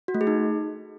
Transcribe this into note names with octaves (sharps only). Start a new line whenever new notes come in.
F#4
A3
G#4
D#4